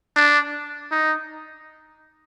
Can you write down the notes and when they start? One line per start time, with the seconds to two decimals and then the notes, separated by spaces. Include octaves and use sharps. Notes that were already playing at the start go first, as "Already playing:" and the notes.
0.16 D4
0.91 D#4